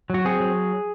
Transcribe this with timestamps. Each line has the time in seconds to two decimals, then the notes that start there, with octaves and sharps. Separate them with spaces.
0.10 F#3 F#4
0.25 C4 G#4
0.40 F#3